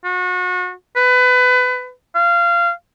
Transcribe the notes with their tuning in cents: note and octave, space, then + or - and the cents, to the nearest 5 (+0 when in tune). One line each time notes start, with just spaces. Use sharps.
F#4 -30
B4 +25
F5 -20